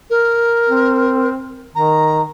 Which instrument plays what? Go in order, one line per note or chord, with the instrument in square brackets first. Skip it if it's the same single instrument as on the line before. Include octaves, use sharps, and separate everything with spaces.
[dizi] A#4
[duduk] C4
[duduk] D#3 [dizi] A#5